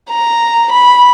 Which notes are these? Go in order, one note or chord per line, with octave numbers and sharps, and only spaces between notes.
A#5
B5